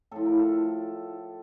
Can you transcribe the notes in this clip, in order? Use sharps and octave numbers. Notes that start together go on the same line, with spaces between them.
A2 F3 A4
A#4
A4